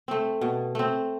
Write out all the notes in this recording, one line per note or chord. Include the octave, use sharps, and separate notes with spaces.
A3 C4
B2
A3 C4